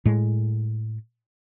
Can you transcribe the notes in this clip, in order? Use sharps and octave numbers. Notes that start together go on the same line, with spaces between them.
A2 G#3